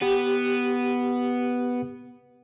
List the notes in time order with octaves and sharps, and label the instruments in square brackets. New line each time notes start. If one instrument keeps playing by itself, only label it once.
[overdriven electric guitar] B3 [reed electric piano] G4